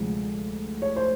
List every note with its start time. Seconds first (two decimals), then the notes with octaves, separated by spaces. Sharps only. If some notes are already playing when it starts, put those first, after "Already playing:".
Already playing: D2 C3 F3 G#3
0.82 C#5
0.97 C5